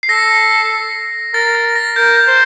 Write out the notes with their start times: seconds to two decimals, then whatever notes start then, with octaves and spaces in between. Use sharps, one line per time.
0.03 C7
0.09 A4 A#6
1.34 A#4 A6
1.55 A6
1.76 A#6
1.96 A#4 G6
2.17 G6
2.27 C5